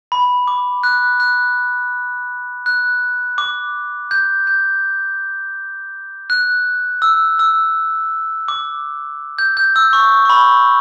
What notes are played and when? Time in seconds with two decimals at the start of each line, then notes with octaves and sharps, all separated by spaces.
0.12 B5
0.47 D6
0.83 F#6
1.20 F#6
2.66 F#6
3.38 D6
4.11 G6
4.47 G6
6.30 F#6
7.02 E6
7.39 E6
8.48 D6
9.38 G6
9.57 G6
9.76 E6
9.93 C#6
10.25 C#6
10.30 B5